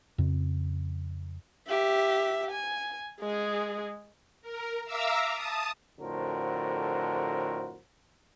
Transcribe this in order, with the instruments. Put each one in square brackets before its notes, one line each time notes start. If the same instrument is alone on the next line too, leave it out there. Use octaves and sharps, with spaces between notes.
[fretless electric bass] F2 C#3 C4
[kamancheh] G4 E5
G#5
G#3 G#4
[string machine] A#4
E5 F5 A#5 D6 E6
A5 D#6
[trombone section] F2 A2 D3 F#4 A#4 C5